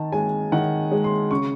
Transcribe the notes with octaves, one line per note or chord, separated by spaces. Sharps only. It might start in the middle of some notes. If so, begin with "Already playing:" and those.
Already playing: D#3 A5
G#3 G#5
D#3 F#5
G#3
C6
C#3 C#6